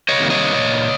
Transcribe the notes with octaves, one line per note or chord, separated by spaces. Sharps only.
C#5 D#5
C3 D#3 G3 A#3
C#5 D#5
A#2